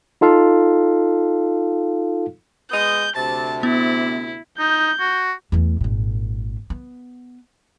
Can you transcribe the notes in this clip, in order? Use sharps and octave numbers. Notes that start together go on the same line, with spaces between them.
D#4 F4 A4 F5
G#3 B3 D#5 G6
D2 C3 A5 A6
B3 E4
D#4 G6
F#4
E2 A3
G#1 A#2
B3